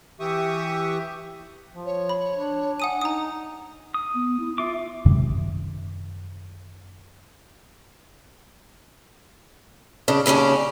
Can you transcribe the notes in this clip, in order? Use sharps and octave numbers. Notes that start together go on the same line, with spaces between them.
E3 G4 E5 C#6 D#6
F3
C#5
B5
D4
F#5 G#5 D#6 D#7
D#4 A#5 D#6
D#6
B3
E4
F4 E5 D6
F#2 C3 D#3 G#3
C#3 D4
D#2 C#3 B3 C#4 D4